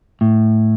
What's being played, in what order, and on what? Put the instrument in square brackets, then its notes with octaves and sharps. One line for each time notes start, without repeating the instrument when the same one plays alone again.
[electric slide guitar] A2